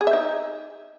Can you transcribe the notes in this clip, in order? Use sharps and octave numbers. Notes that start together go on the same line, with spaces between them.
G#4
E5
D#4